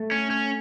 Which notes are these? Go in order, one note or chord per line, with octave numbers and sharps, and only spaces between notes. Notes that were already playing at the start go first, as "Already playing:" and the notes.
Already playing: A3
C#4
C#4